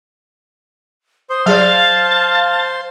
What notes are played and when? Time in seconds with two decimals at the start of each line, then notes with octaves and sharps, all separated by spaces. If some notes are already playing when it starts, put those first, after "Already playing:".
1.30 C5 C6 D#6
1.46 F#3 G#4 D5 F5 A5